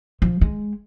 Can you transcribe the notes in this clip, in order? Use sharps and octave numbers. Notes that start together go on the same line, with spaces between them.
F3
G#3